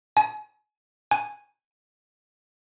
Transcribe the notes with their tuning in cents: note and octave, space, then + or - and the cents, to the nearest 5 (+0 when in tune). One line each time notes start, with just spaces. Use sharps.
G#5 +35
G#5 -5